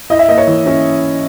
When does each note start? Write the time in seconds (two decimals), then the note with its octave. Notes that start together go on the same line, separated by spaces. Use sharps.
0.10 E4 D#5
0.19 E5
0.28 A#3 D#5
0.38 C#5
0.47 E3
0.66 C#4